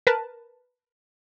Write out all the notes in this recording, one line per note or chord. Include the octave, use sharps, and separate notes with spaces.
A#4 B4 A5